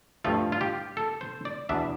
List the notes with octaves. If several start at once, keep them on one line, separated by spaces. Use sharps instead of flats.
G2 F3 A3 F4
F4
G4
A4
C5
D5
E2 B2 B3 D4 E5